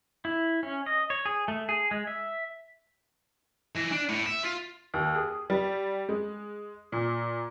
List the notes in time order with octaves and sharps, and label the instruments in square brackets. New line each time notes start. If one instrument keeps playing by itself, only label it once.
[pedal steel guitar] E4
C#4
D#5
C#5
G#4
A3
G#4
G#3
E5
[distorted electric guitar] E3
D4
A2
E5
F4
[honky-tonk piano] D#2
G#4
G3
G#3
A#2